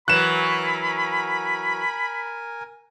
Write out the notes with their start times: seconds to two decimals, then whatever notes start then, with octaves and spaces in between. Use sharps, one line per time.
0.08 E3 F#3 A#4 G#5 B5 F#6 E7